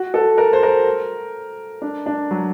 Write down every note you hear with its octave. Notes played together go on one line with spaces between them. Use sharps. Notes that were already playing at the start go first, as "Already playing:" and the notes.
Already playing: F#4
A4
A#4
C5
A#4
D4
D4
F#3